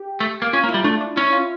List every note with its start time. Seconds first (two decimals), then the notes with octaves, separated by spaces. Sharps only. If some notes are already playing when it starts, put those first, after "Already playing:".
Already playing: G4
0.20 A3
0.42 A#3
0.53 C#4 F4
0.64 A#3
0.69 E4
0.74 G3
0.84 A3 D4
1.01 D4
1.17 C#4 E4
1.33 F4